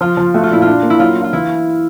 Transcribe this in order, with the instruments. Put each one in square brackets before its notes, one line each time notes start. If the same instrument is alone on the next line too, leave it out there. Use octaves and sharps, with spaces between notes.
[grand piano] F3 [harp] F4
[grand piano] F3
[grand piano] A3 [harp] F#4
[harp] F4
[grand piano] A#2 [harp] E4
[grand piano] D4 [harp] F4
[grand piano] A#3
[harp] E4
[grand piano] F#3 [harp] F4
[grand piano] D4
[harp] F4
[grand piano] E3 [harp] E4